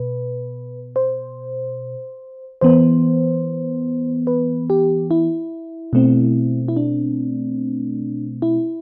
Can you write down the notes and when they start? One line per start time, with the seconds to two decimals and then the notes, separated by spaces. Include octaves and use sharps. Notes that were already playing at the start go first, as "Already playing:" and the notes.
Already playing: B2 B4
0.96 C5
2.61 E3 B3 C5
4.27 B4
4.70 G4
5.11 E4
5.93 B2 A3 C4
6.68 E4
6.77 D4
8.42 E4